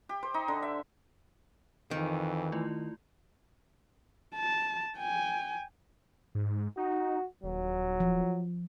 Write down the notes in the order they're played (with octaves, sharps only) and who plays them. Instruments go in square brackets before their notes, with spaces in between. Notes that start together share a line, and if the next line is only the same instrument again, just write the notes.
[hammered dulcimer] G4
C5
D#4
D3
E5
[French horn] F2 [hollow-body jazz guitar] D#3 [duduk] E3
[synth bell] A3 E4 F4
[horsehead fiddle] A5
G5 G#5
[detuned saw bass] G#2
[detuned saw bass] D#4 [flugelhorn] F#4
[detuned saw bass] D#1 [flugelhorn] F#3
[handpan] F3